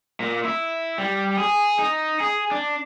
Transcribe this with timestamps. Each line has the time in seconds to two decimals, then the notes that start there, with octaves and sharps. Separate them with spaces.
0.20 A#2
0.45 E4
0.98 G3
1.37 G#4
1.79 D#4
2.20 G#4
2.51 D4